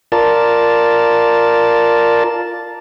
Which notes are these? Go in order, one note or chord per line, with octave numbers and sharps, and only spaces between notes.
F4 A#4 D5 A5